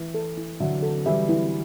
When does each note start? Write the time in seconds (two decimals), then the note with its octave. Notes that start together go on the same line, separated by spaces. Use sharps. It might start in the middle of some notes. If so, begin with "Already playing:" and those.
Already playing: E3 E4
0.14 A4
0.38 E4
0.60 D3 F#3 E5
0.83 A4
1.06 E3 G3 E5
1.29 E4